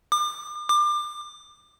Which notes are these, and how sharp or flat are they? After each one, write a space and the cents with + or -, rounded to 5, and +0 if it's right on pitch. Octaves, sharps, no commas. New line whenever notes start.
D6 +40
D6 +30